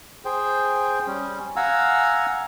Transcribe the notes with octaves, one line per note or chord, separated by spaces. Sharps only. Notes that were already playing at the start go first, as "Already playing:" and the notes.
G#4 C5 G5
G3 C#4
F5 F#5 G#5 A#5 E6